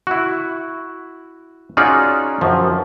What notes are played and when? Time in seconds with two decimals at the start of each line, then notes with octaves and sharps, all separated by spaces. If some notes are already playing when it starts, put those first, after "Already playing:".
0.07 E4 F#4
1.77 C#4 D#4 F4 F#4 G#4 D5
2.41 F#2 F3